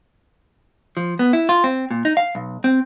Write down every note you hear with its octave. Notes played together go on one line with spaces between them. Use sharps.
F3
B3
E4
F4
C4
A#2
D#4
F5
B1
C4